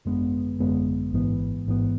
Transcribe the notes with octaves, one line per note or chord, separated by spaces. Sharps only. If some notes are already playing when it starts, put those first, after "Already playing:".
G#1 F#2 D3 G#3 B3
G#1 F#2 D3 G#3 B3
A1 G#2 E3 B3
A1 G#2 E3 B3